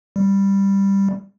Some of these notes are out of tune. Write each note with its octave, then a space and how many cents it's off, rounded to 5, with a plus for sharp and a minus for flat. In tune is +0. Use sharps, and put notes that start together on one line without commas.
G3 +5